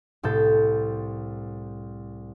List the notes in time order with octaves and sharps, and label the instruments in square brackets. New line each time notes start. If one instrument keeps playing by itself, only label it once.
[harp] C2 A2 A4 G6